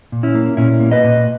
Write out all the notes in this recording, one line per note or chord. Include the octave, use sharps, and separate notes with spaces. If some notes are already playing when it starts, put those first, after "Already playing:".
A#2
C#4 E4
A#3
A#2 C#4 E4
A#3
B4 D#5
A#2